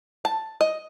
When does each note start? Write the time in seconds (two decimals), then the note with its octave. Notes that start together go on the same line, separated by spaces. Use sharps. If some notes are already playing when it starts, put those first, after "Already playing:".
0.25 A5
0.61 D#5